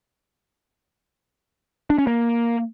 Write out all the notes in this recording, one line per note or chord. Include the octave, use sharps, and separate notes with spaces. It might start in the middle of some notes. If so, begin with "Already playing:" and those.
D4
C#4
A#3